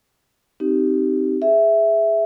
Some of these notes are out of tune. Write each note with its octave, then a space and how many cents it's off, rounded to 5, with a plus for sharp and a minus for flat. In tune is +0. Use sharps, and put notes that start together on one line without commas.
C4 -5 D#4 +0 G4 -20
G#4 +0 E5 +0